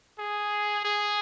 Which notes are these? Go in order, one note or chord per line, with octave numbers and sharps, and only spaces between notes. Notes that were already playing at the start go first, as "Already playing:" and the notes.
G#4
G#4